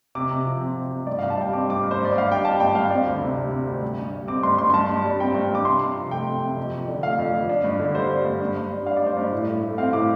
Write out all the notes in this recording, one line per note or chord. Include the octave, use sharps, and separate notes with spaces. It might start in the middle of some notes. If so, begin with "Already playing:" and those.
C3 D6
C3
F3
C4
C3
C3
G2 D5
F5
G2
A5
G3 G5
C4 D6
G2 D6
G2
C5
G2
D5
G2 F5
G3 G5
D4 A5
G2 G5
G2 F5
C4 D5
D2
C3
G3
C4
D2
G2
G2
G3
C4 D6
G2 C6
G2 C6
C6
G2 A5
G2
G3
C4 G5
G2
G2 D6
C3 C6
C3
F3
A3 G5
C3
C3
F2
F2
D3
A3 F5
F2
F2
D4
G2
D3
G3 C5
D4
G2
G2
G2
G3
D4 F5
D5
G2 C5
G2 D5
A2
A2
A3
C4 F5
A2 D6